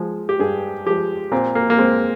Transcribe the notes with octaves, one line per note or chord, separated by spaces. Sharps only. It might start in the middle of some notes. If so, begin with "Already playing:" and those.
Already playing: F3 G#3
G4
G2 G#4
F3 G#3 G4
A#2 C4
A#3
A#3
G#3 C4